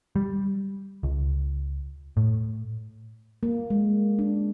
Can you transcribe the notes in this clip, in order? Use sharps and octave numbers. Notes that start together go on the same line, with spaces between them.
G3
C#2
A2
A#3
G#3
D4